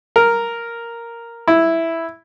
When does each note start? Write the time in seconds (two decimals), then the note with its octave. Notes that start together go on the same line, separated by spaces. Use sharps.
0.16 A#4
1.48 E4